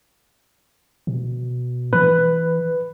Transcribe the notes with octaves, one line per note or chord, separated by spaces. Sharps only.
B2
E3 B4